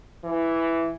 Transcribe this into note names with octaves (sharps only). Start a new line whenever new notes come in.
E3